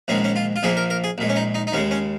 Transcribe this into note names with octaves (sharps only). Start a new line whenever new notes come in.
A#1 G#2 D#3 G#3 C#4
C#4
F4
F4
A#1 A#2 F3 A#3 G#4
A#4
A#4
G#4
A#1 A#2 G#3
C#4
D#4
D#4
D#4
D#2 C#3 G#3 C#4
C#4